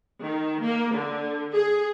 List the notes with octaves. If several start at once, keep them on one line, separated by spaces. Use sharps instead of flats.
D#3
A#3
D3
G#4